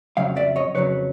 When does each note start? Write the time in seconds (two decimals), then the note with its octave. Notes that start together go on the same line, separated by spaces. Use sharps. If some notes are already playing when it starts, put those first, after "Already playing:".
0.17 F2 C#3 F#3 F5
0.37 D5 E5
0.56 C#5 D#5
0.75 F2 C#3 F#3 B4 C#5